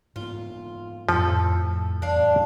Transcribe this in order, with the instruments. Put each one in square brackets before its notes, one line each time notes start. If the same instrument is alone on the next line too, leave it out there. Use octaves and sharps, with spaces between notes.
[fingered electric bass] G#2 A#3 B3 [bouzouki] F4
[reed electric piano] F2 [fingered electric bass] A2 [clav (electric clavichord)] F3 [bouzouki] A4
[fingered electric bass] E2 A2 [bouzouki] D4 F5